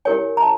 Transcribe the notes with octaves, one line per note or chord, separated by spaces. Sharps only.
E4 G4 A#4 C#5 G#5
A#5
A5